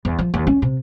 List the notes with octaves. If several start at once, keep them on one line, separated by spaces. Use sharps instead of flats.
E2
F3
D#2
C#4
C3